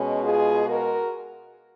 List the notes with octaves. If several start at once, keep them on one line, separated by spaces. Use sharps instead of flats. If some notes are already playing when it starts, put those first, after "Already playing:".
Already playing: B2 G#3 C#4
F4 G#4
F#4 A#4